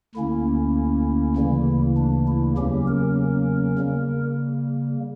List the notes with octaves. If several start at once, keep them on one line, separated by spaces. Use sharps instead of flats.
D2 D3 A#3 C#4 E4
D2 C#3 E3 G3 A#3
D4
E4
E2 C#3 F#3 A#3 C#4 G4
A#4
C#3 G3 A#3